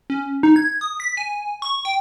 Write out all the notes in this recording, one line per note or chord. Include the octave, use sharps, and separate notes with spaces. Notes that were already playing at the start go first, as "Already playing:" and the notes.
C#4
D#4
G#6
D#6
B6
G#5
C#6
G5